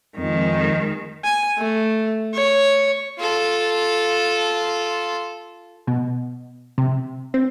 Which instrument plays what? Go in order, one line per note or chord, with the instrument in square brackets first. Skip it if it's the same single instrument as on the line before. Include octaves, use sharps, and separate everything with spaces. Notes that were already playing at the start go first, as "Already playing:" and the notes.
[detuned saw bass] F2 [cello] D#3 G#3
[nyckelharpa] G#5
A3
C#5
[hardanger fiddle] F4 A4
[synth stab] B2
C3
C4